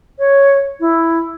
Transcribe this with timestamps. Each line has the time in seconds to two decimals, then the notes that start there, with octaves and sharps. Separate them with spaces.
0.19 C#5
0.80 E4